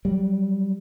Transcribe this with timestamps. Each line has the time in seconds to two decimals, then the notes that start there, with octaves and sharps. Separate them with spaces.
0.05 F#3 G3